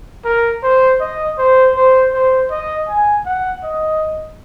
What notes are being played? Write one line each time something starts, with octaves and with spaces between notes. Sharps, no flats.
A#4
C5
D#5
C5
C5
C5
D#5
G#5
F#5
D#5